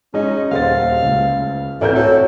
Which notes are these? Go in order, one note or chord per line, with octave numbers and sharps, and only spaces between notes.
G#3 C#4 D#4
D#1 D2 C5 F5 A6
C#2 C#3
A1 E3 C4 A4 A#4 D5 G6
F#4 A4 C#5